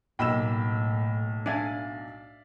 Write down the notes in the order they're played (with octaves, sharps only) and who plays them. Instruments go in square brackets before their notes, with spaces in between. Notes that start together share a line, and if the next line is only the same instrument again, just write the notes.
[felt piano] B1 A#3 E7 [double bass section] A2 [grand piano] G5 B5 E6
[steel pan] D4 G#5 [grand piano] D5 E5 F5